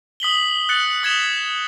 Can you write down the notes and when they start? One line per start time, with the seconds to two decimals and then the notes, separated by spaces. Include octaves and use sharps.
0.20 D#6 B6 F#7 G7
0.69 F#6 A6 C#7 F#7
1.03 D#6 G#6 B6 E7 G7